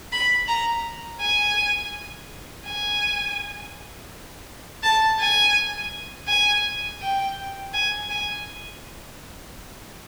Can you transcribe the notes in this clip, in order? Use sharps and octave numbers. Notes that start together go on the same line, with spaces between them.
B5
A#5
G#5
G#5
A5
G#5
G#5
G5
G#5
G#5